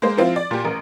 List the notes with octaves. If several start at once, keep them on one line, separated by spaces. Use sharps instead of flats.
G#3 A#3 C5
F3 C4 E4 F4
D5
A#2 G4
A1 A#4